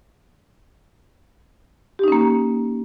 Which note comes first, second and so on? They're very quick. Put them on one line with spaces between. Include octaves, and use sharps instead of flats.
G4 D#4 C#4 A#3